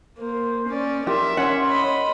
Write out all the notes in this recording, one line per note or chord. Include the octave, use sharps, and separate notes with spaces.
A#3 C5
C#4 D5
G4 A#4 E5 C6
C#4 F#5
D#5 B5